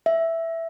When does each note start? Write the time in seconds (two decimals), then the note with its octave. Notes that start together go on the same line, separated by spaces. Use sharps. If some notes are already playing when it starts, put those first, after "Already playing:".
0.06 E5